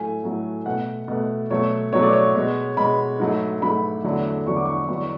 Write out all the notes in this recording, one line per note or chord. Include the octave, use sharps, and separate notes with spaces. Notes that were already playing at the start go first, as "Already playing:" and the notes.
Already playing: A2 F#3 A3 G#5
A2 F#3 A3
B2 A3 F#5
B2 A3
B2 F#3 A3 C#5
B2 F#3 A3 C#5
D5
C#5
B2 G#3
B2 G#3 B5
G#2 F#3 A3
G#2 F#3 A3 B5
E2 D3 F#3 A3
E2 D3 F#3 A3 C#6
D6
C#6
E2 D3 F#3 C#6